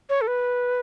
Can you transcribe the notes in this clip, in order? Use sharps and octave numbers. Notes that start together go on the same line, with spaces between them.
C#5
A4
B4